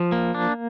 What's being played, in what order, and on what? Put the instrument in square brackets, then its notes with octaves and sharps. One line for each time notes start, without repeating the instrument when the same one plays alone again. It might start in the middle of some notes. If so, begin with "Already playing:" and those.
Already playing: [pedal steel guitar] F3
A#3
D4